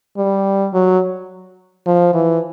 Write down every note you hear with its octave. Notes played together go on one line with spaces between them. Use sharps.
G3
F#3
F3
E3